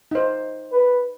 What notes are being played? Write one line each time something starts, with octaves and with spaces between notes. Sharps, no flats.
D#4 C5
B4